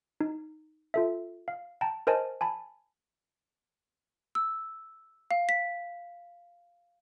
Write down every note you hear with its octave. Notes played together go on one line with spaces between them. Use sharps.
D#4
F4 A4 E5
F5
G5 A5 A#5
A#4 C5 D#5 G#5 A5
G#5 A5 B5
E6
F5
B6